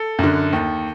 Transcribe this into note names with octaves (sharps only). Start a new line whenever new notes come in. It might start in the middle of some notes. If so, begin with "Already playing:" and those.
Already playing: A4
F#2 D3
D#2